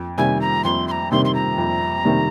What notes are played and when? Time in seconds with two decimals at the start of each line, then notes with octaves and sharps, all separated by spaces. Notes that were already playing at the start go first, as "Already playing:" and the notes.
Already playing: F2
0.18 C3 D#3 G3 G#5
0.41 A#5
0.64 F2 C6
0.88 C6
0.91 A#5
1.12 C3 D#3 G3 C6
1.25 C6
1.34 A#5
1.58 F2
2.05 C3 D#3 G3